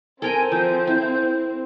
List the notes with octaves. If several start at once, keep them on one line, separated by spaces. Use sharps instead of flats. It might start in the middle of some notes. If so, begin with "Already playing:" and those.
C4 A4 A#4 G5 G#5
F3 G6
E4